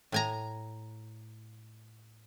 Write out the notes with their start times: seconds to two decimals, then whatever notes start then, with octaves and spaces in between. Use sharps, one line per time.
0.12 A2 G#5 A#5